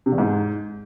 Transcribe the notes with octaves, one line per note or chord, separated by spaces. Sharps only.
C3
E2
G#2